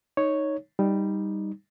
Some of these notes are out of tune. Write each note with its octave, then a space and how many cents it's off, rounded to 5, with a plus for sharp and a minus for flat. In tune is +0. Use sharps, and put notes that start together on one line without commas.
D#4 +0 C#5 +0
G3 +5 D#4 +0